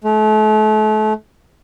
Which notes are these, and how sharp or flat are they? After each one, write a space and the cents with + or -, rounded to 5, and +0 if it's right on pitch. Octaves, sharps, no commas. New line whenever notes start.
A3 -35